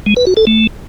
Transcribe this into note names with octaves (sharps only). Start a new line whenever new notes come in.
G#3
B4
F#4
A4
A3